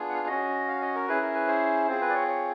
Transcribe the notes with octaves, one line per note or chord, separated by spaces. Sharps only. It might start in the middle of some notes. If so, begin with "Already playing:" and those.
Already playing: B3 D4 F4 G#4
F#5
F5
C#4 F#4 D#5
F5
D#5
A#4
C#4 E4 G#4 B4
A#4
B4
C5
C4 F4 G#4 C5
B4
D5
C#5
C#5